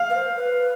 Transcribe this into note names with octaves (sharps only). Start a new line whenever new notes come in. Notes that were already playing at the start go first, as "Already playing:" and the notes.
Already playing: F5
B4
C5
B4